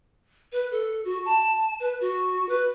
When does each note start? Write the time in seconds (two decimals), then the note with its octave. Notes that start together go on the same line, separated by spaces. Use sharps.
0.52 B4
0.71 A4
1.05 F#4
1.25 A5
1.80 B4
2.00 F#4
2.48 B4